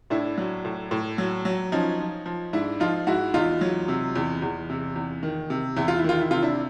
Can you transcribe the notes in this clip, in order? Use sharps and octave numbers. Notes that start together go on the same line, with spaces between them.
A2 D4 E4
F#3
A2
A2
F#3
F#3
F3 C#4 D#4
F3
F3
G#2 D4 E4
F3 D#4 F4
G#2 E4 F#4
E2 D#4 F4
F#3
C3
E2
E2
C3
E2
D#3
C3
E2 E4
F4
E4
D#3 F4
E4
C3 F4
D4 E4